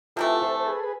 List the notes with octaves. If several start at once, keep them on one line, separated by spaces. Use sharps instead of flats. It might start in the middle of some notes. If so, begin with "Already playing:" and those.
C3 E3 A3 F4 A4
A4 C5
C5
G#4 B4
A4
B4